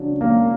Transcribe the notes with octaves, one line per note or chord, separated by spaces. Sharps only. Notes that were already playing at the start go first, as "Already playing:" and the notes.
Already playing: C#3 F#3 D4
A#3